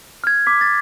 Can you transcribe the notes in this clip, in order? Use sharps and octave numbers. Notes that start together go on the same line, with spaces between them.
F6 G#6
D6 B6
A6